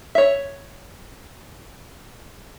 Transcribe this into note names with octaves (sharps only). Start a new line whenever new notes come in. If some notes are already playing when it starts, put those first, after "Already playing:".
C#5 E5